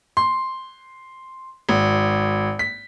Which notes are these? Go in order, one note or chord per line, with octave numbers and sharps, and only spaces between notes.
C6
G#1
B6